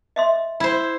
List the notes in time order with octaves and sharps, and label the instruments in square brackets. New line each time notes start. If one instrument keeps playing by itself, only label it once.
[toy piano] D#5 E5 C6
[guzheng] E4 C5